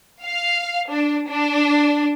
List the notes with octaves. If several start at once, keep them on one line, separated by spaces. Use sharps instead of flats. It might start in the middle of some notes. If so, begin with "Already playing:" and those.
F5
D4
D4